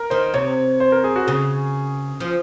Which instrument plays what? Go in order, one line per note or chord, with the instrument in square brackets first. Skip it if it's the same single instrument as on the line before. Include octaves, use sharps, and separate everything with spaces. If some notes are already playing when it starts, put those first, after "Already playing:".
Already playing: [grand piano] A#4
[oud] D#3 [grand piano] C5
[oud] C3 [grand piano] C#5
[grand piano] C5
A#4
G#4
F#4
[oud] C#3 [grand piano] G#4
[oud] F3